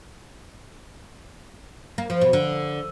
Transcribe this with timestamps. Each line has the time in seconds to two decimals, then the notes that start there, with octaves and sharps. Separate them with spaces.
1.98 A#3
2.10 F3
2.21 B2
2.33 D3